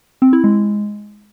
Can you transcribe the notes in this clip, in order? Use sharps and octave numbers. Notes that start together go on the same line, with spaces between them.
C4
E4
G#3